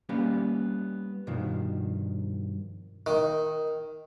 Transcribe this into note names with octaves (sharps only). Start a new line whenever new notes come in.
G3 A#3 B3 C#4 G4
G2 B2 D#3 F3
D#3